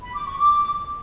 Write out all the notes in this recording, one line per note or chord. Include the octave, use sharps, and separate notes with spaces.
B5
D6
C#6
D6